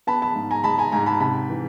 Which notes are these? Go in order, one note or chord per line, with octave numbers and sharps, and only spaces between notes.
B3 A5 B5
A5 B5
G#2
G#5 A#5
G#3 A5 B5
G#5 A#5
G#2 G#5 A#5
A5 B5
C3 A5 B5
E3